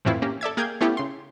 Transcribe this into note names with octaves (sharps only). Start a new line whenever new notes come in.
F2 A2 E3 C4 E4 F4
A#3 C#4 G4
A4 D5 E5 G#6
A#3 G#4 F5 G5 G6 G#6
A3 B3 C#4 E4 G4
C#3 C6